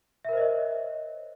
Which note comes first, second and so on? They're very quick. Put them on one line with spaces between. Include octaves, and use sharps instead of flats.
E5 A#4 C5 D#5 C#5